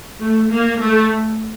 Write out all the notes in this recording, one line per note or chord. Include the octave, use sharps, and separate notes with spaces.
A3
A#3
A3